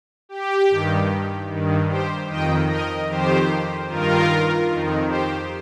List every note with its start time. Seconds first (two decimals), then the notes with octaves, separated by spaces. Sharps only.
0.29 G4
0.70 G2 D#3
1.49 G2 D#3
1.89 G4 C5
2.29 F2 D#3 D#5 G5
2.69 A#4 D#5
3.08 F2 D#3 G4 C5
3.89 G2 D#3 F4 A#4
4.69 F2 D#3
5.08 G4 C5